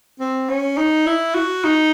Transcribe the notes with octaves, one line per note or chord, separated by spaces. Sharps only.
C4
C#4
D#4
E4
F#4
D#4